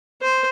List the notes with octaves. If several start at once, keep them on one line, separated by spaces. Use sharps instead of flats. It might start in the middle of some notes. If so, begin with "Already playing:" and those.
C5